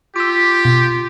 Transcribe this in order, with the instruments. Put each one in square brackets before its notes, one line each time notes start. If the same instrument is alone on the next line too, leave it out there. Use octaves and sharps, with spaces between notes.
[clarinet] F4 [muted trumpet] G4 [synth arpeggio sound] D6 E6
[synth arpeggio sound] B2